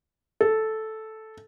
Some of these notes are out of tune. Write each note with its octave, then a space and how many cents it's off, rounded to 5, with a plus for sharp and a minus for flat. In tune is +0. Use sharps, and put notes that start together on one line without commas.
A4 -5